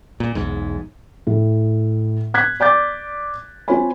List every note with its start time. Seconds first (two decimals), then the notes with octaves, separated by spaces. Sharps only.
0.20 A#2
0.35 B1 E2 G#2
1.27 A2
2.34 F#6 G#6 B6
2.60 D5 D6 G6 A6
3.68 C4 F4 C5 C#5 G#5 B5